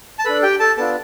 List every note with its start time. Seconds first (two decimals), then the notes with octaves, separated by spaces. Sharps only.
0.19 A5
0.25 D4 A4 B4 B5
0.43 G4 G5
0.60 A4 A5
0.77 B3 D4 F4 A4 A5